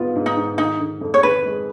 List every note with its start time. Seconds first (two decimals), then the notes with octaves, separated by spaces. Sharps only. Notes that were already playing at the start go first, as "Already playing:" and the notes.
Already playing: G#2 B3 F4
0.16 G#2
0.26 D#4
0.37 G#2
0.58 D#3 D#4
0.80 D#3
1.01 F2
1.14 C#5
1.23 D#3 B4
1.45 G#3